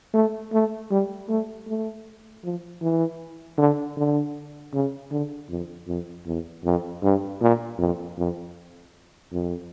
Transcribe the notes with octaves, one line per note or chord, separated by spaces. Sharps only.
A3
A3
G3
A3
A3
F3
E3
D3
D3
C#3
D3
F2
F2
E2
F2
G2
A#2
F2
F2
F2